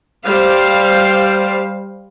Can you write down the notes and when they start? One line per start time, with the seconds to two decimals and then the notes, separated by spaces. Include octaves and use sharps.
0.24 G3 C5 F5